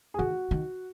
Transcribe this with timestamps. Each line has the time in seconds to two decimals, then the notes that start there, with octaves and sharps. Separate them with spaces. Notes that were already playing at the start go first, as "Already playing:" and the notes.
0.14 G#4
0.18 D#3 F#4
0.51 D#3